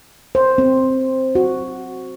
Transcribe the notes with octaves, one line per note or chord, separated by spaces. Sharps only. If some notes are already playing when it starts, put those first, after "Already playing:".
C5
C4
F#4